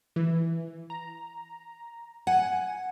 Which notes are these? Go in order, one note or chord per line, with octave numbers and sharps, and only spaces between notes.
E3
A#5
F#5 G#5